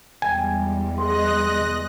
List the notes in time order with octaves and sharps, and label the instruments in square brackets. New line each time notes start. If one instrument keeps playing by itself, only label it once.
[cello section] E2 G3 G#3 [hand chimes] G5 [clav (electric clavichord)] G#5
[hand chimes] G#4 F#5 C6 [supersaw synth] D#5 F#6 A#6